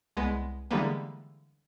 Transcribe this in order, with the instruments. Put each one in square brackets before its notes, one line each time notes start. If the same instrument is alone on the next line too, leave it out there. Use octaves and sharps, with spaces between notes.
[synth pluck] C2 G#3 B3
D3 E3 G3 G#3 A#3 B3